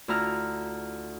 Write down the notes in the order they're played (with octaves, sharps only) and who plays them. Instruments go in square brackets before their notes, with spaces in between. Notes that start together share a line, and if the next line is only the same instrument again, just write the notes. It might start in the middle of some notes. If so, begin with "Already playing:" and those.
[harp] D2 E4 F4 A#5 F6